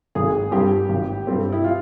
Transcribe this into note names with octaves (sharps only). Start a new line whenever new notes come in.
G#1 G#4
G2 G3 C4 G4
G#1
G2 G3 C4
E4
F4